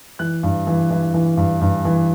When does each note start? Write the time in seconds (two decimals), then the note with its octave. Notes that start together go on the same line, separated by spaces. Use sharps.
0.19 E3 F#6
0.43 G2
0.67 E3
0.90 E3
1.14 E3
1.37 G2
1.61 G2
1.85 E3